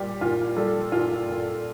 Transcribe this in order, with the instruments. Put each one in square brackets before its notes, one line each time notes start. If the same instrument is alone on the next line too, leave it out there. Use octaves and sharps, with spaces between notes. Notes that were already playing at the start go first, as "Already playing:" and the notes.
Already playing: [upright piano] A#2 G3 G4
A#2 F4
G3 A4
A#2 F4
A#2